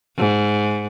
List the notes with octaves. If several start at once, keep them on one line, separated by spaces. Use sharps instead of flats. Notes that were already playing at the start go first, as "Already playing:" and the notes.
G#2